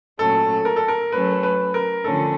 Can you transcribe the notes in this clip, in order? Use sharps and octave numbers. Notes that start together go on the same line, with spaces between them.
A#2 F#3 A3 C#4 A4
A#4
A4
A#4
F#3 A3 C#4 B4
B4
A#4
D3 F3 A3 C#4 A4